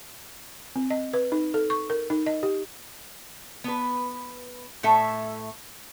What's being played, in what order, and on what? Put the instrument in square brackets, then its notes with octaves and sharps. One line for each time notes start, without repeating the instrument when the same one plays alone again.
[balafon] C4
D#5
B4
D#4
A4
C#6
A#4
D#4
D#5
G4
[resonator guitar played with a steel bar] B3 B4
A2 A3 A4 E5